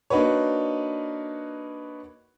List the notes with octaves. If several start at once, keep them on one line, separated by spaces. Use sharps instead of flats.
A#3 D4 D#4 F#4 B4 C#5